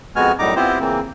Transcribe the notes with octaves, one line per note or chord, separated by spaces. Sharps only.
F2 G#3 B3 F#4 G#5 F6
F#2 A2 G3 D#4 A#5 D6
B3 C4 E4 F4 G4 C5
C#3 E3 A#3 C4